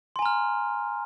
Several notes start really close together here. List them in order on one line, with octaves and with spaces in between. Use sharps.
C6 G#5 A#5 F6